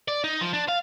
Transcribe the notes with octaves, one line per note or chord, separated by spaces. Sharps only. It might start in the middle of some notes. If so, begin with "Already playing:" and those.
D5
D#4
F3
D4
F5